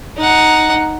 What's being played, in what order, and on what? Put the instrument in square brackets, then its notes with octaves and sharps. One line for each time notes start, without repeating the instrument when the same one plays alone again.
[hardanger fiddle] D#4 F#5